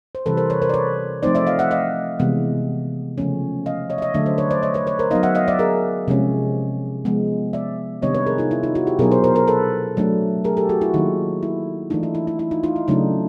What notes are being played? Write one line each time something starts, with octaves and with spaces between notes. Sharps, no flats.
C5
C3 E3 G3 A4 B4
A#4 C5
B4 C#5
A#4 C5
D5
B4 C#5
F3 A3 C4 D#4 C5 D5
D5 E5
D#5 F5
E5 F#5
D#5 F5
C3 E3 G#3 B3
C#3 F3 A3 C#4
D#5 F5
C#5 D#5
E5
C#5 D#5
D3 F#3 A3 D4 D5 E5
C5 D5
B4 C#5
C5 D5
C#5 D#5
B4 C#5
B4 C#5
A#4 C5
F#3 B3 D#4 D#5 F5
E5 F#5
D#5 F5
D5 E5
G#4 A#4
C3 F3 G#3 C#4
F3 G#3 B3
D5 E5
C3 D#3 G3 B3 D4 C#5 D#5
B4 C#5
G#4 A#4
D#4 F4
E4
D#4 F4
E4 F#4
F4 G4
B2 F#3 B3 D#4 G#4 A#4
A#4 C5
A#4 C5
A#4 C5
A4 B4
F#3 A3 D4
G#4 A#4
G4 A4
F#4 G#4
E4 F#4
D#3 F#3 A#3 D#4 F4
E4
E3 A3 D4 D#4 F4
E4
E4
E4
E4
D#4 F4
D#4 F4
E4
C#3 F#3 A3 D4 D#4